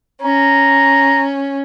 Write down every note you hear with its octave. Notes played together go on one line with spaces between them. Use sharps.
C#4 A#5